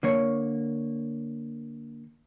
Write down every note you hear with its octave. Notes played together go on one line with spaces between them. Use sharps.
D3 A#3 C#5